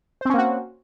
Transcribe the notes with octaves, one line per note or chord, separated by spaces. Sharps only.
A#3 C4 C#4 F#4 C5